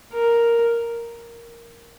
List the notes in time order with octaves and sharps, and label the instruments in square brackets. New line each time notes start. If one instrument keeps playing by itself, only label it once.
[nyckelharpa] A#4